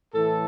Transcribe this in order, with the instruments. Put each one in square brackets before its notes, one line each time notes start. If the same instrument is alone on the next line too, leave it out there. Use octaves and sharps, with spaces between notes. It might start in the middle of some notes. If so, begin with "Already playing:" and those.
[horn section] A2 E3 A4